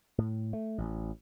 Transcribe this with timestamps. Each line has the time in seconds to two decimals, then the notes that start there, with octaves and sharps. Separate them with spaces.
0.18 A2
0.53 A3
0.78 A1